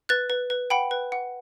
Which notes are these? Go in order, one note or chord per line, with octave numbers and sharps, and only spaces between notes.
B4 F#6 A6
B4
B4
F#5 G5 B5
B4
F#5